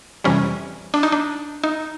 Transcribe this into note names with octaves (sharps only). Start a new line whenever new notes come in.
F2 C3 E3 G3 C#4
D4
D#4
D4
D#4